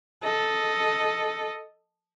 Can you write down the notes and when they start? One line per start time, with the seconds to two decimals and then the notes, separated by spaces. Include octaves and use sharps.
0.23 A4 D#5